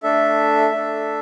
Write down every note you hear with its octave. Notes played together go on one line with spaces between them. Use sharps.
A3 D4 A4 E5
A3 D4 A4